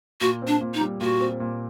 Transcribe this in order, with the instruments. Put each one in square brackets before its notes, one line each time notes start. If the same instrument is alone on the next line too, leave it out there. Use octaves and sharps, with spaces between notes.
[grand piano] A#2 [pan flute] F#4
[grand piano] C4
[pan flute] D4
[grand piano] A#2
[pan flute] D#4
[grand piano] G3
[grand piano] A#2 [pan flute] F#4
[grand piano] C4
A#2